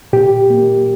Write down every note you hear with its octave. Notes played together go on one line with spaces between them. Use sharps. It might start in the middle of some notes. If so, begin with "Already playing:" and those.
A#2 G4
A#3